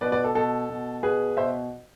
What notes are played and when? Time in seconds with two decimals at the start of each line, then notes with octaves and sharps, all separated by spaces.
0.01 B2 B4 D5
0.12 B4 D5
0.24 A4
0.35 B2 A4
0.70 B2
1.03 B2 G#4 B4
1.37 B2 C5 E5